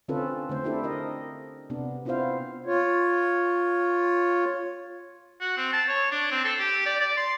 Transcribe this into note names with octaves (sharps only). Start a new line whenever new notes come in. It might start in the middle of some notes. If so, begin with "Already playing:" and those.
D3 C4 C#4 F4 A4 B4
D3 A3 C5
C4 D4 E4 G4 A4
A#4 D#5
C3 B3 D4
B3 C4 E4 F4 C5 F5
F4 C#5
F#4
C4
A5
C#5
D4
C4
A4
G4
D5
D5
C6